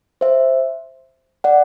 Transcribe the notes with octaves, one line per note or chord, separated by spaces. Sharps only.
C5 E5
D5 F#5